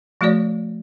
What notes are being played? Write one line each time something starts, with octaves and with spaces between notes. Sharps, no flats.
F3 A3 F#4 C#5 D5